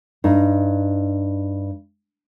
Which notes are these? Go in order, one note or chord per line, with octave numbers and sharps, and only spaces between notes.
G2 D#4